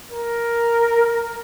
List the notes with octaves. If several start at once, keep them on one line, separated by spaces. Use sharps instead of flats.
A#4